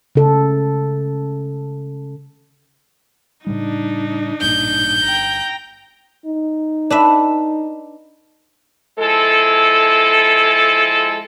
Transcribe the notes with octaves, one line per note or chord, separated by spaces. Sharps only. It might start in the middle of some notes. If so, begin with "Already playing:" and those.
C#3 A4
A2 C#3 G3 D4 D#4
A1 G2 A#2 G6
G1 G5 A#5
D#4
D4 B4 E5
F3 G#3 E4 A4